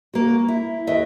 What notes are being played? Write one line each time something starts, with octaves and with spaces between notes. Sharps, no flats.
A#3 F#4
E4
D#2 D#5 E5